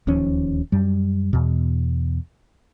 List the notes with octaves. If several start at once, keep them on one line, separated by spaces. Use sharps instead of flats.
D1 D#2 F3 C#4
F#2 G3
E2 B2